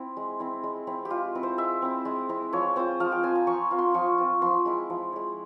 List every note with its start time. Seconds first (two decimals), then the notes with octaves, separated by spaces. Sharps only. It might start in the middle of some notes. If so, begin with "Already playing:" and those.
Already playing: C4 E4
0.17 G#3
0.40 C4 E4
0.63 G#3
0.87 C4 E4
1.05 G4
1.10 G#3 F4
1.35 C4 E4
1.43 C5
1.58 G#3 E5
1.82 C4 E4
2.05 G#3
2.29 C4 E4
2.53 F3 C#5
2.76 C4 F4 C5
3.00 F3 F5
3.12 G5
3.23 C4 F4 G#5
3.35 A#5
3.47 F3 C#6
3.71 C4 F4
3.78 C6
3.94 F3 C#6
4.18 C4 F4
4.42 F3 C6
4.65 G#3 E4
4.90 F3
5.13 G#3 E4